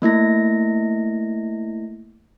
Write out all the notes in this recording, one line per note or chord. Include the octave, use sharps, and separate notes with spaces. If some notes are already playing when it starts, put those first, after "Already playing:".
A3 A#3 E4 A#6